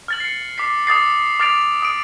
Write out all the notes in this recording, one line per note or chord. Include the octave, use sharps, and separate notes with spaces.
F6 A6 F#7
C7 C#7
D6 B6 C7
D6 D#6 A6 C7
D6 F6 A6 C7 D7 F7
D#6 D7